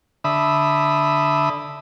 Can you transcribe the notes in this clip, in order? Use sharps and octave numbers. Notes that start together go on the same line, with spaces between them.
D3 E5 B5 D#6